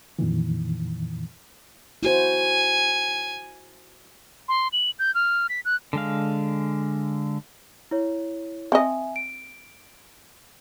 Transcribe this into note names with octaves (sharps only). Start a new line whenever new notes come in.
F2 A#2 D#3 E3
E4 F#4 C5 G#5
C6
F#7
G6
F6
B6
F#6
D3 G#3 F5
E4 C#5
C4 D#5 E5 G#5
D7